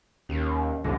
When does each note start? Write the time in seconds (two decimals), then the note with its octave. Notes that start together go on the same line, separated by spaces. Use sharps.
0.29 D#2 C#4 G4 A#4
0.84 G1 C#2 D3 A#6